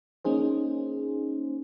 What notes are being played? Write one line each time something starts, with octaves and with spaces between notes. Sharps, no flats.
A#3 C#4 D#4 G#4 C5